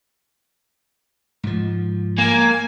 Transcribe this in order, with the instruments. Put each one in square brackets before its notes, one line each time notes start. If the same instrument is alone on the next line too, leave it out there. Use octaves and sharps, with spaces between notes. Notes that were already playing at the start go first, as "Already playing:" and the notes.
[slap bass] G#2 F3
[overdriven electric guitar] A#3 [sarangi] G#5